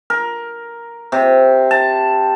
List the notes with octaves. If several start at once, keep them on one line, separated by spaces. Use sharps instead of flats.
A#4
C3
A5